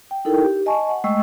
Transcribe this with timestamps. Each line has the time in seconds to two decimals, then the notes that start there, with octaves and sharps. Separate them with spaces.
0.11 G5
0.25 D#4 E4 A4 A#4 G5
0.42 G4
0.66 D#5 G#5 A5 C#6
0.89 F#5
1.04 G#3 A3 D#5 G5 C#6 E6